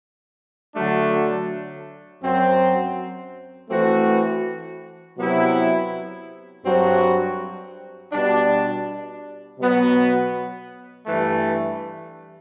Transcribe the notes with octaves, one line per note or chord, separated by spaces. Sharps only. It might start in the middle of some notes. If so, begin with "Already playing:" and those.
D3 F#3 A3 D4
F#2 F#3 C4
E3 A3 C4 F#4
C3 F#3 B3 E4
G2 F#3 C4 F#4
B2 G3 D4
B2 F#3 B3 F#4
G2 E3 A3